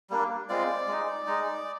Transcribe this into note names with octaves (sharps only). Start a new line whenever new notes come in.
G3 A#3 D4
G#3 C4 F4 D5
G#3 D#4
G#3 D#4